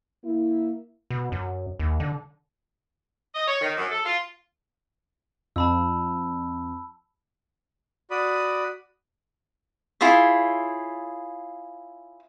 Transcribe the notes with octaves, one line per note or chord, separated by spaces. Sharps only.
A#3 E4
B2
F#2
D#2
D3
D#5
C#5
D#3
F#2
A4
F4
F2 A5 B5 E6
F#4 D5 B5 D#6
E4 F4 G#4 C#5